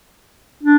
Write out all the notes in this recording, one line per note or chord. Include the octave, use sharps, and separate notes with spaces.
D4